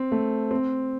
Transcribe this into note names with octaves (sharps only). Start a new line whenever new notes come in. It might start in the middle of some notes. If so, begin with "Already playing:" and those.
Already playing: C4
A3
C4